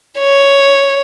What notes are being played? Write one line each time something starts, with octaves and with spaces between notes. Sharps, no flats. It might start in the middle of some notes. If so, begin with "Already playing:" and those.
C#5